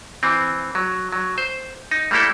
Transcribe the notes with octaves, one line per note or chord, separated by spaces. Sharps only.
E3 C4
F#3
F#3
C5
D#4
G3 A3 A#3 E4 A4